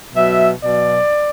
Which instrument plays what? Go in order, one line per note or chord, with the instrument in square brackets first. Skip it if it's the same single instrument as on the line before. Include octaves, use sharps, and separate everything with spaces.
[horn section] B2 F#3 E5
B2 F#3 D5